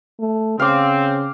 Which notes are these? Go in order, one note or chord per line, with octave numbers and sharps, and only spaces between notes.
A3
C#3 C4 F5 D6